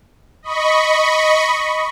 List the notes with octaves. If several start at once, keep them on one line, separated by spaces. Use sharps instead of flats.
D#5 B5 C#6